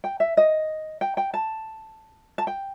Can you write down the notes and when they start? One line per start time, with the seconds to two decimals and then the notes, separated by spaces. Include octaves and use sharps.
0.04 G5
0.20 E5
0.37 D#5
1.01 G5
1.17 G5
1.34 A5
2.38 A5
2.47 G5